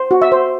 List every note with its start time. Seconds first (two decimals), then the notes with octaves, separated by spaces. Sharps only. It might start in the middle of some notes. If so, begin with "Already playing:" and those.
Already playing: C5
0.11 F#4
0.22 E5
0.32 C5